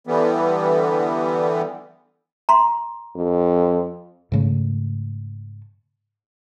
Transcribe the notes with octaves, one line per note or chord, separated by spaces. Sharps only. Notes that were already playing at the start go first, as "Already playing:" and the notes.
D3 E3 G3 B3
A#5 C6
F2
G#2 C#3 A3